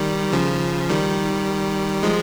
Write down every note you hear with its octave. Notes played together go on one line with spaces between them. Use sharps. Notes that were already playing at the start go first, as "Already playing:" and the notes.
Already playing: D#3 G3
C#3 F3
D#3 G3
F3 G#3